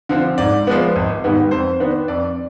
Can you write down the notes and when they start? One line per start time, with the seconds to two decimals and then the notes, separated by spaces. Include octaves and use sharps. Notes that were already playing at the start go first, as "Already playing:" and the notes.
0.09 D3 F3 C4
0.38 G#2 D5
0.67 F3 G#3 B3
0.96 G#1
1.24 G#2 D#3 G3 B3
1.51 F2 C5
1.80 D#3 B3 D4
2.08 F2 D5